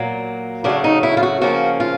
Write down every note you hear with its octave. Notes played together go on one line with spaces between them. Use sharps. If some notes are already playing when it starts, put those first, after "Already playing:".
Already playing: A#2 F#3 A#3
C#3 F#3 A3 D4
D#4
E4
F4
F#4
C#3 F3 A#3 C#4 F#4
F4